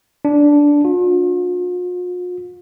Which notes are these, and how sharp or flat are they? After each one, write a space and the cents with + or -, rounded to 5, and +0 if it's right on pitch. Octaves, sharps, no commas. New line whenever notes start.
D4 -10
F4 +45